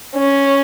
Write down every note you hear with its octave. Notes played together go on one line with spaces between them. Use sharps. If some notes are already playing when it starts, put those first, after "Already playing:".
C#4